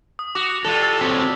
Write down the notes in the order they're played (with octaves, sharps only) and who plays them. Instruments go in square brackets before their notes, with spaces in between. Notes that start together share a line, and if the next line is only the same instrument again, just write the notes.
[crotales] D#6
[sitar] F#4 [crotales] D6 D#6 F7
[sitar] A2 G3 F4 [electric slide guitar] A4
[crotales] E6
[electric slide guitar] C4 F#4 C#5 [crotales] B6